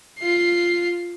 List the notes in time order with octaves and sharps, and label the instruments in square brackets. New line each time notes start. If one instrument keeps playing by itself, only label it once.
[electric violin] F4 C7